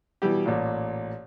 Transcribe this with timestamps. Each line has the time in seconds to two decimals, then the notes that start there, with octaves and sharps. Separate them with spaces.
0.22 B2 E3 G3 G4
0.46 A1 A#2